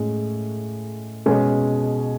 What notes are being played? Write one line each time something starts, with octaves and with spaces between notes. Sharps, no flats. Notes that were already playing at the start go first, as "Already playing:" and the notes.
Already playing: A2 G#3 C#4
B2 G#3 C#4